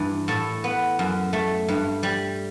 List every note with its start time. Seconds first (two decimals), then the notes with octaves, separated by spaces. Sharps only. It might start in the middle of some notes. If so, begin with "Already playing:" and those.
Already playing: G2 E3
0.28 A2 A4
0.64 B3
0.99 F#2
1.33 A3
1.68 G2
2.03 G3